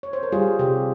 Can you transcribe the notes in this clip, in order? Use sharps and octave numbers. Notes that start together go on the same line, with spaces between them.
C#5
C5
A#4
G3 F4 G#4
C3 G4